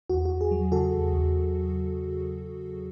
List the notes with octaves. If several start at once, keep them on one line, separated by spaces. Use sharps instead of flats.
E2 F#4
F#4
E2
G#4
F#3
C#3 F#4 A4
E2
E2